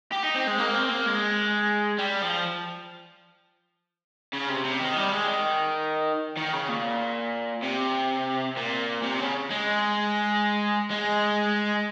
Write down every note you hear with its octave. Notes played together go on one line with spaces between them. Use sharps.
G4
D#4
C4
G#3
A#3
C4
A#3
G#3
G3
F3
C#3
C3
C3
D#3
G3
G#3
D#3
D#3
C#3
A#2
C3
A#2
C3
C#3
G#3
G#3